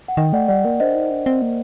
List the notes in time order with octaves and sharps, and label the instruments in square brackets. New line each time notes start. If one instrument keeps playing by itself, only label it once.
[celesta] F#5
[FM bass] D#3 [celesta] D#5 G5
[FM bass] A3 [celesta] D5 F#5
[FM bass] G3 [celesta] D5 F#5
[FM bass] A#3 [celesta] A#4 D5
[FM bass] D4 [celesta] C5 D#5
[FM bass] D#4
D4
C4
A#3